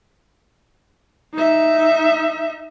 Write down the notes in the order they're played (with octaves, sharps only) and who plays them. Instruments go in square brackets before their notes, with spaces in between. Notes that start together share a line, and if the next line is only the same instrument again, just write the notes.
[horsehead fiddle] D#4 E5